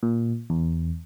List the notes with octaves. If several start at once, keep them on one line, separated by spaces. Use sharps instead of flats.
A#2
E2